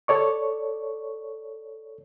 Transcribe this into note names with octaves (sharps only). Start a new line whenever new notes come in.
A4 C#5 D5 C#6